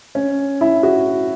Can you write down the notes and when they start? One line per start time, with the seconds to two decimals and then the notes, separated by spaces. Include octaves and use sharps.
0.15 C#4
0.61 E4
0.83 F#4